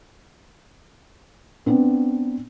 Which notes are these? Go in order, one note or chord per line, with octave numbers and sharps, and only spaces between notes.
B3 C4 D4